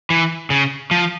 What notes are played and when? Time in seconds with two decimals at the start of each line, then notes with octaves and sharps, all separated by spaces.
0.10 E3
0.50 C#3
0.91 F3